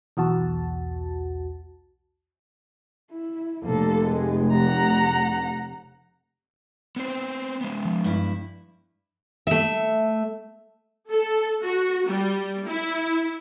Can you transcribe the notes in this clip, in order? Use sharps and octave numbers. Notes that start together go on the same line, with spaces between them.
B1 E2 F#4 A5
E4
F1 A#3 A4
G#3
F#5 A#5
B3 C4 C5
G#3 B3
F3
G2 E4
A3 E5
A4
F#4
G3
E4